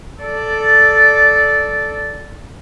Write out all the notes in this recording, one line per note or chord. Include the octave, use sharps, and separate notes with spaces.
A4 D5